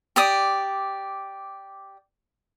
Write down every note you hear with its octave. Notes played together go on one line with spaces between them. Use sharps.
G4 D5 D#6